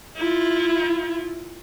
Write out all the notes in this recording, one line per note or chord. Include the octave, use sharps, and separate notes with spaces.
E4 F4